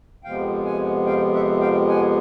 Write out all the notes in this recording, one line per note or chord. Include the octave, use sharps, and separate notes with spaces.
F2 C3 F3 G#3 B3 F5 G5
F#5 G#5
F5 G5
E5 F#5
F5 G5
F#5 G#5